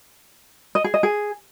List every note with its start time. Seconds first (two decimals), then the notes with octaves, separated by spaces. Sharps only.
0.75 D#5
0.84 G#4
0.94 D#5
1.03 G#4